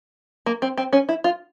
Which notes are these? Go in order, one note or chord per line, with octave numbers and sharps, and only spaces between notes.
A#3
C4
C4
C#4
E4
F4